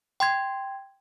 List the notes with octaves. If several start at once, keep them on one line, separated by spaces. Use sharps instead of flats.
G5 C6 G#6